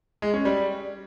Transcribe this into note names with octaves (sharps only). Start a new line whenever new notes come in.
G#3
C#4
G3